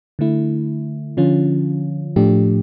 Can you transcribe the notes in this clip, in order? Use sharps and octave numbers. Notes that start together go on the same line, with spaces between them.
D3 A3 E4
D3 F3 C#4 F4
A2 F3 A3 D4 G4